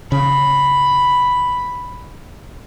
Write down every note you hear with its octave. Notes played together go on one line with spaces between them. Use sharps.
C#3 B5